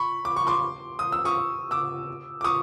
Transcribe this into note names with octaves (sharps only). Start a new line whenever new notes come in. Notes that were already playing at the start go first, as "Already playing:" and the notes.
Already playing: B5 C#6
D6
C#6
C6 D6
D#6
E6
C#6 D#6
D6 E6
D6
C#6 D#6